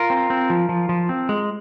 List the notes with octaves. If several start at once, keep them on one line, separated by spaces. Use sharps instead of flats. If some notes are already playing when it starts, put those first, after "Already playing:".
Already playing: F4 A#4
C4
C4
F3
F3
F3
C4
G#3